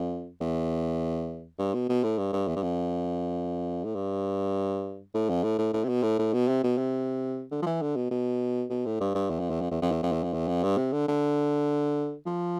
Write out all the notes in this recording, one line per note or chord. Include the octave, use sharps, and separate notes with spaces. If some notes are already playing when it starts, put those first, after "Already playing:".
Already playing: F2
E2
G2
B2
B2
A2
G2
G2
E2
G2
F2
A2
G2
A2
F2
A2
A2
A2
C3
B2
A2
A2
B2
C3
B2
C3
D3
F3
E3
D3
B2
B2
B2
A2
G2
G2
E2
F2
E2
F2
E2
F2
E2
F2
E2
F2
E2
F2
G2
C3
D3
D3
F3